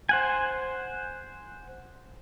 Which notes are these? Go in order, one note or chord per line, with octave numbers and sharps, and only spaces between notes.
C5 F#5 G#5